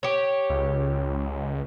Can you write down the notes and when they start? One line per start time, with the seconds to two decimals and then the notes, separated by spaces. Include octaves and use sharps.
0.03 G4 C#5
0.50 C#2